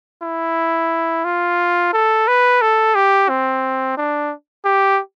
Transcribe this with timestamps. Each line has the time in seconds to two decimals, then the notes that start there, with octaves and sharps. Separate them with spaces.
0.23 E4
1.25 F4
1.93 A4
2.27 B4
2.62 A4
2.95 G4
3.29 C4
3.97 D4
4.65 G4